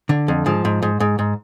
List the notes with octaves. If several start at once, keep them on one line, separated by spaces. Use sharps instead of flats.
D3
F2
G#2 F3
G#2
G#2
G#2
G#2